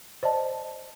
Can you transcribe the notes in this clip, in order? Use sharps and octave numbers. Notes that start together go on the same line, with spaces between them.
C5 D5 D#5 A5